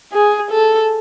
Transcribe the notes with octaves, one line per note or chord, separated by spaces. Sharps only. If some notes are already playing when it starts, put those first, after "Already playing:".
G#4
A4